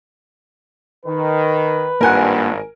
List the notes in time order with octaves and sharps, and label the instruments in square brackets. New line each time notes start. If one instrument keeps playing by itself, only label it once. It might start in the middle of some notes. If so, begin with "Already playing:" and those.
[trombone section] D#3 [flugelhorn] B4
[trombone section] G#1 G2 [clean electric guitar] A#3 F4 F#5 [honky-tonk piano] A#4 G#5